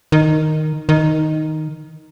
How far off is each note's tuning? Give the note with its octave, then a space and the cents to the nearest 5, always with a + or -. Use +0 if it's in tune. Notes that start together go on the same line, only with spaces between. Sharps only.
D#3 -5
D#3 +0